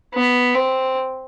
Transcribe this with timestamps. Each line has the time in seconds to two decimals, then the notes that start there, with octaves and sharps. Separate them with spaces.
0.15 B3
0.55 C4